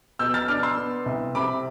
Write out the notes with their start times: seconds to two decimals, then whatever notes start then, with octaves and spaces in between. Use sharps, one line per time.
0.19 B2 E6 G6
0.34 F6 A6
0.48 D4 D6 F6
0.63 C6 E6
0.77 B3
1.06 C2
1.35 C3 B5 D6